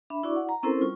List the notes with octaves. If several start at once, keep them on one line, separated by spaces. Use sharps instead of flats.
D4 E5 B5
E4 F#4 D5 C#6 D6
F#5
A#5
C4 C#4 E4 A4 A#4 C5
G3 F4 C#6